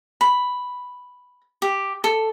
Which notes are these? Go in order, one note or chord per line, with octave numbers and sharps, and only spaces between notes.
B5
G4
A4